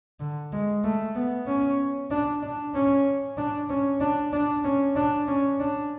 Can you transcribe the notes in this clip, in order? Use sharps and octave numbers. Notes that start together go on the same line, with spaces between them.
D3
G#3
A3
B3
C#4
D4
D4
C#4
D4
C#4
D4
D4
C#4
D4
C#4
D4